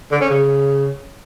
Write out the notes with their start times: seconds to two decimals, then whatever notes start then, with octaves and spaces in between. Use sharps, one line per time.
0.11 D3
0.21 C#4
0.30 C#3